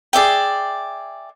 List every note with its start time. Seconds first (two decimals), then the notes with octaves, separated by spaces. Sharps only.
0.13 G#4 D5 E5 G5